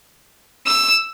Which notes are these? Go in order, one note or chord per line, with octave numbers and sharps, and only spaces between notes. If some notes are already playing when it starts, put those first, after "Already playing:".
E6